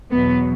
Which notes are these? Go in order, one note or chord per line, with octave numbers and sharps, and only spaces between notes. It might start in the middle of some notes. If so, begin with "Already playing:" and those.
E2 B2 F#3 B3